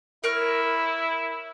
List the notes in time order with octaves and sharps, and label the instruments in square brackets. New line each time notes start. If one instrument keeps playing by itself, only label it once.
[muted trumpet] E4 [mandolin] A#4 C#5 F6